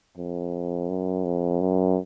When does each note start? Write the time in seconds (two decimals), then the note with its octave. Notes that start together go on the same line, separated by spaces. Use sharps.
0.17 F2
0.89 F#2
1.25 F2
1.61 F#2